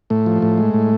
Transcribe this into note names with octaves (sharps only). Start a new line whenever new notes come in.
A2 A3
F3
A2
G#3
A2